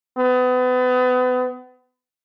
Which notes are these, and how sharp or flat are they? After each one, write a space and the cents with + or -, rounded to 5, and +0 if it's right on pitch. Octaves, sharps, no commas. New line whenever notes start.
B3 +35